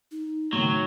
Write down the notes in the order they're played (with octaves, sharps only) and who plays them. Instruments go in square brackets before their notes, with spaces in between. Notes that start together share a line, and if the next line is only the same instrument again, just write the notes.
[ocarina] D#4
[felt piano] A2 D#3 [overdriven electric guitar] F#3 [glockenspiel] C#6